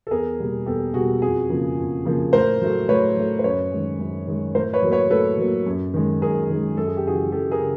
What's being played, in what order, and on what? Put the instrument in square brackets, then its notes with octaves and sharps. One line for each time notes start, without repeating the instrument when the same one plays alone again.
[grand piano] A4
E2 G#4 A#4
B2 G3 A#3
E2 G4 A4
B2 G3 A#3 F#4 G#4
F2 F#4 G#4
C#3 F3 A#3
F2
C#3 F3 A#3
A2 A#4 C5
F#3 A3
A2 B4 C#5
F#3 A3
C5
F#2 B4 C#5
D#3 G#3
F#2
D#3 G#3
A2 A#4 C5
B4 C#5
F#3 A#3
B4 C#5
A2 A4 B4
F#3 A#3
F#2
D#3 G#3
F#2 G#4 A#4
D#3 G#3
F#2 A4
G#4
G4
C#3 E3 F#4 G#4
F#2 G4 A4
G#4 A#4
C#3